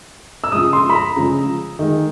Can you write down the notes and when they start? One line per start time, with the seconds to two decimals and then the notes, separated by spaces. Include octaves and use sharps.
0.44 E6
0.52 C#3 F3 G#3 D#6
0.73 C6
0.90 B5
0.95 A#5
1.16 C#3 F3 G#3
1.79 D#3 G#3